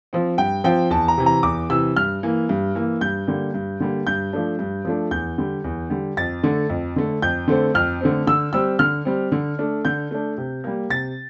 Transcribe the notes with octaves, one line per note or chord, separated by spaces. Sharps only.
F3 C4
G2 G5
F3 C4 G5
E2 A5
A#5
C3 E3
A#5
E2 D6
C3 E3 E6
G2 F6
E3 A#3
G2
E3 A#3
G2 G6
D3 G3 A#3
G2
D3 G3 A#3
G2 G6
F3 A3 D4
G2
F3 A3 D4
E2 G6
D3 G3
E2
D3 G3
F2 A6
D3 A3
F2
D3 A3
F2 G6
D3 A3 C4
F2 F6
D3 A3 C4
D3 E6
G3 C4 E6
D3 F6
G3 C4
D3
A3 D4
D3 G6
A3 D4
C3
G3 A#3
C3 A6